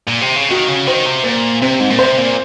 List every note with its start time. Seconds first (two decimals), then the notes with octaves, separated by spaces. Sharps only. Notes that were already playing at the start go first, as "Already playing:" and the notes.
0.08 A#2
0.22 C3
0.36 C#3
0.51 D#3 F#4
0.69 C#3
0.87 D#3 C5
1.06 C3
1.24 A#2 C5
1.62 C3 C4
1.80 G#2
1.90 A#2
1.99 C3 C5
2.18 A#2